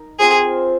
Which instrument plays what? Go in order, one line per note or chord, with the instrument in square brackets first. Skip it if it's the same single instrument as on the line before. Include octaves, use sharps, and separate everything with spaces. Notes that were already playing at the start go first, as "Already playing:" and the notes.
Already playing: [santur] D#4 A#4
[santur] C4 F4 C5 [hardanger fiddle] G#4